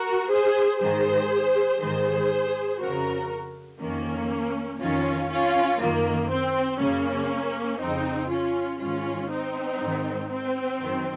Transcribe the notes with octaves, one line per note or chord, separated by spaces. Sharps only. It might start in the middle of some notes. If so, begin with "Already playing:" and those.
Already playing: F#4 A#4
G#4 C5
G#2 D#3 G#4 C5
G#2 D#3 G#4 C5
F2 C#3 F#4 A#4
F2 D#3 A#3 C#4
F2 D#3 C#4 F4
C#4 F4
F#2 D#3 A#3
C4
F#2 C#3 A#3 C#4
F2 C#3 C4 D#4
C#4 F4
G#2 D#3 C#4 F4
C4 D#4
G#2 D#3
C4
F#2 D#3